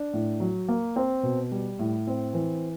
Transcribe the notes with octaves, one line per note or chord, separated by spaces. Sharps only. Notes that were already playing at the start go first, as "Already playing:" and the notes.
Already playing: D4
A2
F#3
A#3
C4
B2
G3
A2
C4
E3